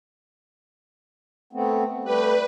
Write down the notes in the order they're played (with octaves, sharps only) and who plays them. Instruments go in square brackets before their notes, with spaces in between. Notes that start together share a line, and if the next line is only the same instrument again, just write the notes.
[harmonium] A3 B3 C4
[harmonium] G3 A3 G4 [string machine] B4